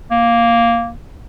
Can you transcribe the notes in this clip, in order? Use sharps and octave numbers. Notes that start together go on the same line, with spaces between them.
A#3